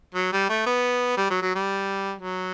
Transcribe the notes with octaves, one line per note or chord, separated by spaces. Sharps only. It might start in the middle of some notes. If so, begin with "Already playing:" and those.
F#3
G3
A3
B3
G3
F#3
F#3
G3
F#3